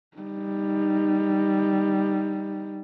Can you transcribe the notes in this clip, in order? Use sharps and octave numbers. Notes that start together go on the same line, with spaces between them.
G3 D#4